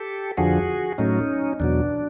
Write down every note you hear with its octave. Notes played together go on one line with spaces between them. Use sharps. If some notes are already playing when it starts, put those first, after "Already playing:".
Already playing: G4 A4
F2 D3 F3 F#4 G#4
A2 F#3 A3 C#4 D#4
E2 B2 F#3 D4